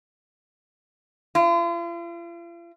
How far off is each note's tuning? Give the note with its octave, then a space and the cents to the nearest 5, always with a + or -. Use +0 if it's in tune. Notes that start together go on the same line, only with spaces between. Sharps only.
F4 -45